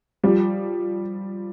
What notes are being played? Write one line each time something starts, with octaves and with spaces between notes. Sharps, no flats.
F3 G3